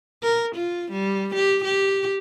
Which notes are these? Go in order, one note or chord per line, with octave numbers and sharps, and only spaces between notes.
A#4
F4
G3
G4
G4